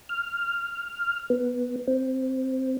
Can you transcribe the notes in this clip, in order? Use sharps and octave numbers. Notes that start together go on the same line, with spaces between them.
F6
B3
C4